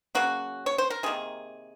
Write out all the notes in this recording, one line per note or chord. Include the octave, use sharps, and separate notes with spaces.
C#3 F#3 A#3 F#4
C#5
C5
A#4
C3 D#3 A#3 G#4